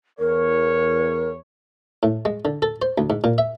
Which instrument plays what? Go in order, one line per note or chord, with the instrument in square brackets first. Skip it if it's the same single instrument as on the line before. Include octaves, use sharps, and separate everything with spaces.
[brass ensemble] E2 C#5 [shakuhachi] A#4
[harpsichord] A2
G#3
D3
A4
C5
D2
G#2
A#2
E5